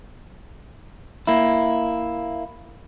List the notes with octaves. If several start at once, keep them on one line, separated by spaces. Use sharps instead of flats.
A#3 E4